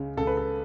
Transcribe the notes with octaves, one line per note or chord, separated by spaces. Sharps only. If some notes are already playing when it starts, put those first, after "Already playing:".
Already playing: C#2 C#3
C#2 A4
B4
A4